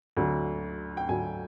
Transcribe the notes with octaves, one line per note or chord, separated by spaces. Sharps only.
D2 D3 F#3
G5
D2 D3 F#3 G#5